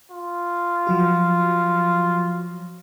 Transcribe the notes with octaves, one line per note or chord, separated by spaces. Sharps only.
F4
F3 F#3 F#4